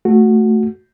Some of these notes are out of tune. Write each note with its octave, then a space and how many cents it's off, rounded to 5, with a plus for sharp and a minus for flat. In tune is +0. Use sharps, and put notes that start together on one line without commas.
A3 +0 F#4 -5